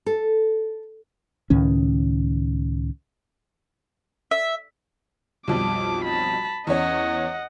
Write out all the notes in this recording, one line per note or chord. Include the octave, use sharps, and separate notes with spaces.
A4
C#2 A2 D#3 C#4
E5
B1 F2 G3 D6
A5 B5
E2 C#4 C#5 D#5 F#5